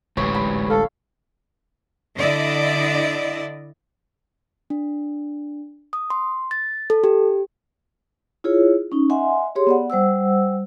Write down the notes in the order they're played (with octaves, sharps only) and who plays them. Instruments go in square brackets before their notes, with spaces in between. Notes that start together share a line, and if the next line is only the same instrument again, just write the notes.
[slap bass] D1 A1 D2 [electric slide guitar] G#3 G4 B4 [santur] C#5
[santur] B5
[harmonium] A4 [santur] F5
[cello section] D3 E4 D5 D#5
[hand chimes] D4
D#6
C6
A6
A4
G4
[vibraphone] E4 F4 G#4 C#5
C#4 D#4
D#5 E5 F#5 G#5 C6
G4 G#4 C#5 C6
B3 D5 F#5
G3 C5 F#5 E6